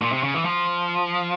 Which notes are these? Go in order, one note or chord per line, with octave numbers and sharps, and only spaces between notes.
A#2
C3
C#3
E3
F3